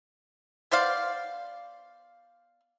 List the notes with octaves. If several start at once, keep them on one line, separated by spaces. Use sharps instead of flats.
B3 C5 D5 F5